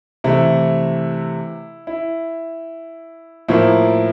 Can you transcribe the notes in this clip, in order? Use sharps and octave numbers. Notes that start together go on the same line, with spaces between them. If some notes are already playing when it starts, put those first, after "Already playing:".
C3 E3 A3 E4
E4
A2 F3 A#3 E4